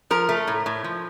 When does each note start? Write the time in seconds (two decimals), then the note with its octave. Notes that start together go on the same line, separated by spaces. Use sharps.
0.11 F3 A#4
0.29 A3
0.47 A2
0.66 A2
0.84 F3